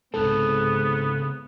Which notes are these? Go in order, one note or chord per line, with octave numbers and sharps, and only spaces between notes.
C2 G#2 C#3 B3 C4 A4